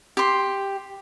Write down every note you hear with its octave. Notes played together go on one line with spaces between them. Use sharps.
G4 C6